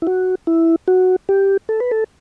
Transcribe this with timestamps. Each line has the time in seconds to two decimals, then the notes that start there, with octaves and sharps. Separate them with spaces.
0.02 E4
0.07 F#4
0.47 E4
0.88 F#4
1.29 G4
1.69 A4
1.80 B4
1.91 A4